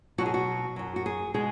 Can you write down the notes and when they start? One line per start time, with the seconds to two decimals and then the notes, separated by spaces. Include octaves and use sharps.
0.18 B2 F#3 F#4
0.26 G#4
0.34 F#4
0.76 F#2 F#3
0.96 F#4
1.06 G#4
1.34 B2 G#3 G#4